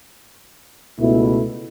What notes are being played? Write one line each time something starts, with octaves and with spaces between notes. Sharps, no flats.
C#2 B2 A3 E4